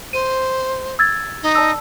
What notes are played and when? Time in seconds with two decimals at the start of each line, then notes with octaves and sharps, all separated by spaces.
0.13 C5 D#7
0.99 E6 G#6 A6
1.43 D#4
1.55 D5 A5 E6